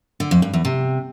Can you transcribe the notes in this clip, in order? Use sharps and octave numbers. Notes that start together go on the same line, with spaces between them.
D3
F2
G2
E2
C3